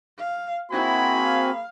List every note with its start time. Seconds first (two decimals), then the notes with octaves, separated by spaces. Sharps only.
0.18 F5
0.71 A#3 C4 E4 F#4 G#4 G#5 B5
1.23 F5